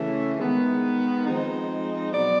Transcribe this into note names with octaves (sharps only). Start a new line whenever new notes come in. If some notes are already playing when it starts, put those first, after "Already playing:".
Already playing: C#3 E3 A3 C#4
D#3 G#3 B3
F3 G#3 C4 D#4
B2 F#3 B3 D5